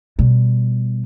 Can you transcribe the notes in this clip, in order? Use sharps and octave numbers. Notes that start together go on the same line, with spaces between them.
B2 G3